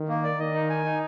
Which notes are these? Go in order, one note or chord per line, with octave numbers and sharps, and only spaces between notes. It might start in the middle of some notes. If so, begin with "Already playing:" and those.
Already playing: D#3
A#3
D5
D#3 D#5
D#4
G#5
D#4